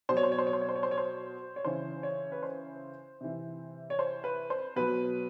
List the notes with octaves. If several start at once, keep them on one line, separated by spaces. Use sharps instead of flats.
B2 F#3 C5 C#5
C5
C#5
C5
C#5
C5
C#5
C5
C#5
C5
C#5
C5
C#5
C#3 E3 C5
C#5
B4
C5
C3 E3
C#5
C5
B4
C5
B2 F#3 B4